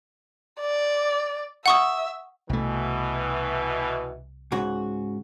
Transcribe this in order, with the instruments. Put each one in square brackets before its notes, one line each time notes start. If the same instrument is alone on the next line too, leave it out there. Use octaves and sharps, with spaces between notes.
[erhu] D5
[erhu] E5 [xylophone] F#5 C#6 D#6
[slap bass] C2 A3 [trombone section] B2 E3
[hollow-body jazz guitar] G#2 C#3 F#4